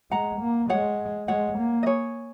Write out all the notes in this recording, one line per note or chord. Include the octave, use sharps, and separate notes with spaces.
G#3 F#5 A#5
A#3
G#3 C#5 F#5
G#3 C#5 F#5
A#3
D#5
G#4 C#5